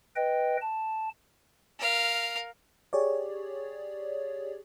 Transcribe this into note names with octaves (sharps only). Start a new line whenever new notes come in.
B4 D#5 G5
A5
A#4 F5
G4 G#4 C#5 D5